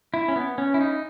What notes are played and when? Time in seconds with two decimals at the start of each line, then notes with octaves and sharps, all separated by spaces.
0.14 E4
0.28 C#4
0.36 B3
0.58 C#4
0.74 E4
0.81 D#4